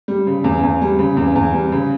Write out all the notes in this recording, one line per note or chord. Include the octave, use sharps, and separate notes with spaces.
G3
C#3
E2
E2
G3
C#3
E2
E2
G3
C#3